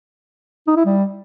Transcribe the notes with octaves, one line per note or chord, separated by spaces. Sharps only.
D#4
E4
G3